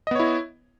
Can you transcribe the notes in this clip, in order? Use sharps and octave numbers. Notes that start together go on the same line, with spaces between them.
B3 E4 C#5 D#5